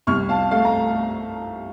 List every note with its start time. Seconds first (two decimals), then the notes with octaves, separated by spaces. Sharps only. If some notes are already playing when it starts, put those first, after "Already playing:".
0.07 C2 C#6 F6
0.29 F5 A5
0.51 A3 F5
0.65 A#5